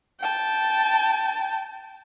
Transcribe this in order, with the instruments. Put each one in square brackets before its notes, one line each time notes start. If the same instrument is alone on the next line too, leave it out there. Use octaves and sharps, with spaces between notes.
[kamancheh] G5 A5